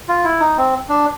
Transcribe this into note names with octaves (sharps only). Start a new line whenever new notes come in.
F4
E4
D#4
C4
D4